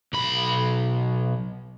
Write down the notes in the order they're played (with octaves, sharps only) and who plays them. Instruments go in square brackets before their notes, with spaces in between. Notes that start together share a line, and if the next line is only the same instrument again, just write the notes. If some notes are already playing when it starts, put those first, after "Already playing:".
[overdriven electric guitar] B1 B5